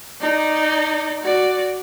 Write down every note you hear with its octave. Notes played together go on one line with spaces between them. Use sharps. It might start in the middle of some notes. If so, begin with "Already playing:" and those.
D#4 D5
F#4 D5